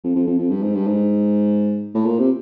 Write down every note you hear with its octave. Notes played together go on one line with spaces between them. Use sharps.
F2
F2
F2
F2
G2
G#2
G2
G#2
A2
A#2
C3